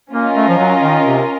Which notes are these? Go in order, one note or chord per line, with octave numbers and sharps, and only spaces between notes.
A#3 C#4 F4 A#4 D#5
A3
F3
F#3
D#3
C3